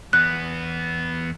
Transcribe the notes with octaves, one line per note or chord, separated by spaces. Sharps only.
E2 B3 F#6